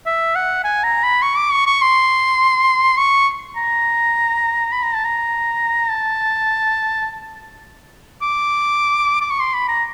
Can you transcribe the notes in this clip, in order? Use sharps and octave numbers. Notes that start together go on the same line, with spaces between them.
E5
F#5
G#5
A#5
B5
C#6
D6
C#6
C#6
C6
C#6
A#5
B5
A#5
A5
A#5
A5
D6
D6
C#6
C6
B5
A#5